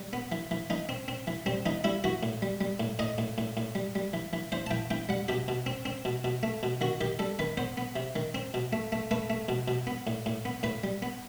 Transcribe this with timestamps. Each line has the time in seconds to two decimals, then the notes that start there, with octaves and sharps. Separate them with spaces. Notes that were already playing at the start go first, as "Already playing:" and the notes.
Already playing: G3
0.13 B3
0.32 E3
0.51 E3
0.70 E3 D#4
0.89 C4
1.08 C4
1.27 E3
1.46 G3 C4
1.66 E3 D#4
1.84 G3 E4
2.04 E3 F#4
2.23 A2
2.42 G3
2.61 G3
2.80 A2
2.99 A2 D#5
3.18 A2
3.38 A2
3.57 A2
3.75 G3
3.95 G3
4.13 E3
4.33 E3
4.52 E3 C5
4.66 A5
4.71 E3 G5
4.90 E3 G5
5.09 G3 F#5
5.28 B2 G4
5.48 B2
5.66 C4
5.85 C4
6.05 B2
6.24 B2
6.43 A3
6.63 B2
6.81 D#3 F#4
7.01 D#3 G4
7.19 G3 A4
7.39 D#3 B4
7.57 B3 C5
7.77 B3
7.96 C3
8.16 D#3
8.35 C4
8.54 B2
8.73 A3
8.92 A3
9.11 A3 B4
9.30 A3
9.49 B2
9.68 B2
9.87 B3
10.07 A2
10.26 A2
10.45 B3
10.63 A2 B4
10.84 G3
11.02 B3